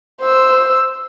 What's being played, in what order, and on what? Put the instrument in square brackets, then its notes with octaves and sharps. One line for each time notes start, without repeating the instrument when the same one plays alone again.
[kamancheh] C5 E6